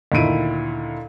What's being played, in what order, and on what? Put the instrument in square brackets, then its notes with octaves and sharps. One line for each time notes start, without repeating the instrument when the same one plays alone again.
[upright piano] D2 A#2 D#3 E4 D7 D#7